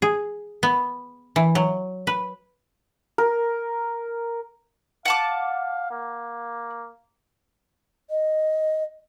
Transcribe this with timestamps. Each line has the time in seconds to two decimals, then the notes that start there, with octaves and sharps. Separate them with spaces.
0.02 G#4
0.63 B3
1.36 E3
1.55 F#3
2.07 B4
3.18 A#4
5.06 F5 F#5 A5 D6
5.90 A#3
8.10 D#5